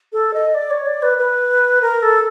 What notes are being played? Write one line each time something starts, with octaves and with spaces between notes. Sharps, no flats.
A4
D#5
D5
C#5
D5
B4
B4
A#4
A4